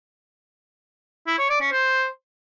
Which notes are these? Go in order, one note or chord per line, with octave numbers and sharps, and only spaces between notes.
E4
C#5
D5
C#4
C5